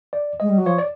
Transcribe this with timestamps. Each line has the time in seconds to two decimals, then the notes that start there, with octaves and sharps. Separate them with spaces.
0.13 D5
0.40 G#3 D#5
0.49 G3
0.58 F#3
0.66 F3 C#5
0.78 D5